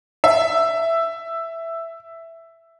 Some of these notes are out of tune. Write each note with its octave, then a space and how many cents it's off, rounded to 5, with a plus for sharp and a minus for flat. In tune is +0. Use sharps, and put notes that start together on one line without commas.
E5 +5